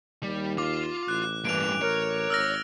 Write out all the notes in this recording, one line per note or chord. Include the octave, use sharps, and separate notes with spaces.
D#2 G3
F4 D6
A1 F#6
G2 E3 G3 A#3 D7 F7
A#4 C#5
G#1 E6 F6 A#6